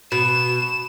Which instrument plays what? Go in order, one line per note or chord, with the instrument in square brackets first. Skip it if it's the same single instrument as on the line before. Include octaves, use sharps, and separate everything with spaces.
[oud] B2 [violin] E7